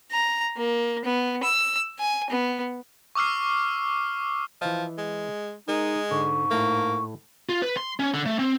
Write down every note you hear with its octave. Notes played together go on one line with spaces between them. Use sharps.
A#5
A#3
B3
E6
G#5
B3
C#6 D6 E6 F6 C7
E3 F3 D#5
G#3
G#3 D#4 A#4
G#2 D3 C#6
A2 A3 A#3
F4
B4
C6
C#4
D3
A3
C4